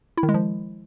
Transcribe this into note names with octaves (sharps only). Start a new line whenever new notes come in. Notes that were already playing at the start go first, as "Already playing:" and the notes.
E4
D#3
G#3
F3